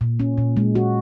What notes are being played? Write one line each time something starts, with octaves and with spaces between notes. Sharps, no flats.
A#2
C#4
A#2
G#3
F#4